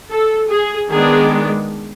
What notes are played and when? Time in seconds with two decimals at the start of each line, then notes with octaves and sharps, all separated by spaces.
0.09 A4
0.48 G#4
0.89 D#3 G#3 B3 D4 G#4